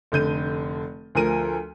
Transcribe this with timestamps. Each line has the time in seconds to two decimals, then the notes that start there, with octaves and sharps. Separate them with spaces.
0.12 F1 D3 G6 D#7
1.15 D2 F3 A#4 D#7